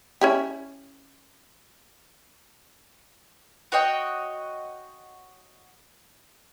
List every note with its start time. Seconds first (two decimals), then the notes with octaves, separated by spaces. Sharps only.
0.21 C#4 E4 G4
3.72 F#4 C#5 D#5 G5